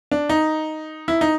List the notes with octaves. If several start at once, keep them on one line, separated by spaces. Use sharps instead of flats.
D4
D#4
E4
D#4